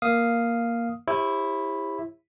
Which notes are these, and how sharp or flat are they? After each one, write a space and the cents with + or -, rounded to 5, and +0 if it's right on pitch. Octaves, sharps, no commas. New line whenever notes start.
A#3 +5 F5 +0 D#6 +0
E4 +0 G4 +25 C5 +45